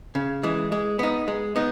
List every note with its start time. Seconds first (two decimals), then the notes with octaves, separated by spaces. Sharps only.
0.15 C#3
0.43 E3 G#3
0.72 G#3
0.99 B3 D#4
1.28 G#3
1.56 B3 D#4